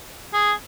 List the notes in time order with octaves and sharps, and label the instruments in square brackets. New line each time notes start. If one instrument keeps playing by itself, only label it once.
[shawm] G#4